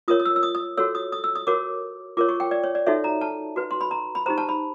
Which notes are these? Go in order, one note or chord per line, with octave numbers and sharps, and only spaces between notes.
F4 A#4 C#5 D#6
D#6
E6
E6
D#6
D#6
F#4 A4 C#5 E6
D#6
D#6
E6
D#6
F#4 A#4 C#5 D6
F4 A#4 C#5 D6
C#6
G5
D5
C#5
D5
D#4 F#4 A4 C#5 E5
A#5
A5
F#4 B4
C6
B5
A#5
B5
D#4 G4 C5 A#5
A5
B5